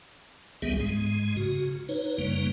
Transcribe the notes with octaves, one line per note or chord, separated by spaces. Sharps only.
C#2 D#3 G3 B3 G#4 E5
G#2 G#3
C#3 F#4
D#4 B4 C#5
F#2 C#3 G3 A#3